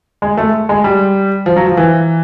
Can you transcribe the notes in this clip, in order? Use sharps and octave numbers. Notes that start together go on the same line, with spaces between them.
G#3
A3
G#3
G3
F3
F#3
F3
E3